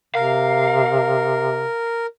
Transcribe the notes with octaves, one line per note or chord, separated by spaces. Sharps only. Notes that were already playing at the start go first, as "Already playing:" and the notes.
C3 A#4 F5